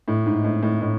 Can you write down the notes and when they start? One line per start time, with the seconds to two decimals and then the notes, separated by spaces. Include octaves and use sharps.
0.08 A2
0.26 G#2
0.44 A2
0.62 A2
0.81 A2